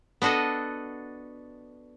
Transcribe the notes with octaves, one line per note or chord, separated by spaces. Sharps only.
B3 D4 F#4 A4 D#5